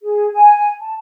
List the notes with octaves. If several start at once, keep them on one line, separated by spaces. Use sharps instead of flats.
G#4
G#5
A5